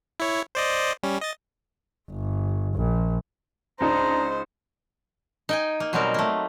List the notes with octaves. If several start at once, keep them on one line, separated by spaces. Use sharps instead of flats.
E4 C#5
C5 D5 D#5
G3 C#4
D#5 A6
G1
A#1
C#2 D4 D#4 C5 A#5
D#4 G5 G#5
A#3
B2 F#3 G3 C4 D#4 A#4
A3 A#3